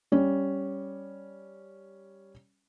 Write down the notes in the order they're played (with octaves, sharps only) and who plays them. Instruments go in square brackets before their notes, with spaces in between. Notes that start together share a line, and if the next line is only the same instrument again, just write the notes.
[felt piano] G3 C#4